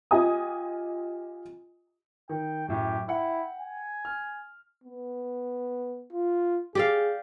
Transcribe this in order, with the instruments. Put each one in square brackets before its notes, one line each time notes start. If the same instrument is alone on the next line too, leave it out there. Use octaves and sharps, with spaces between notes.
[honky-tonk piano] F4 G4 D#5 G#5 D#6
[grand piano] D#3 [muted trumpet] G5
[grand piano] F#2 A2 [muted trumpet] G4
[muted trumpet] E4 [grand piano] F#5 G5
[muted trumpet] G#5
[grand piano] F6
[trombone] B3
F4
[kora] G4 D5 F5 [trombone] G#4